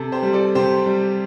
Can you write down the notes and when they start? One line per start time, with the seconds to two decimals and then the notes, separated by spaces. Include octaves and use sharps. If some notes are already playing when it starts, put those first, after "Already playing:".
Already playing: C3 A4
0.12 G4 C5
0.23 G3
0.33 A4 D5
0.55 C3 G4 C5
0.86 G3